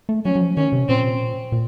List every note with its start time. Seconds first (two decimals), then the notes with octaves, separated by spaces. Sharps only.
0.09 A3
0.25 F#3 C#4
0.36 F#3
0.41 F3
0.57 D#3 C#4
0.72 C3
0.88 A#2 C4
1.52 A#2